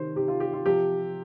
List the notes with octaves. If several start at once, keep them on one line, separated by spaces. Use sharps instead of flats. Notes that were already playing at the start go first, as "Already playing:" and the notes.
Already playing: C3 D#3 C5
C3 D#3 G4
F4
G4
F4
C3 F3 G4